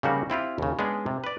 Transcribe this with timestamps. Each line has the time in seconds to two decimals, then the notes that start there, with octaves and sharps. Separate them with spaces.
0.03 C#3 F3 G3 A#3 D#4 F#4
0.30 C4 E4 F4 G4
0.58 D#2 C#3
0.79 G#3 B3 C#4 D4 G#4
1.06 C3
1.24 B4 D5